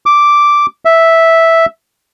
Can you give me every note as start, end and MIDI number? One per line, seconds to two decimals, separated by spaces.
0.06 0.66 86
0.85 1.66 76